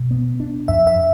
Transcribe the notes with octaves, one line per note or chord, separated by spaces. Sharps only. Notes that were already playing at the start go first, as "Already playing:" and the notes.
Already playing: B2
B3
D4
F2 E5
E5